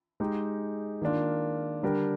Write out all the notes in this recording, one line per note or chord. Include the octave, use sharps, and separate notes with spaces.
G#3 D#4 G4
D#3 A#3 D4 F4
D3 G3 D4 G4 A#4